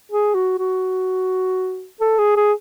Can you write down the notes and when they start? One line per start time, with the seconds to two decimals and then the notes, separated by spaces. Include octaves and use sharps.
0.12 G#4
0.35 F#4
0.59 F#4
2.01 A4
2.18 G#4
2.37 G#4